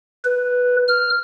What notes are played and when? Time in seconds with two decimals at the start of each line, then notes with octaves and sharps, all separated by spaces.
0.25 B4
0.88 F6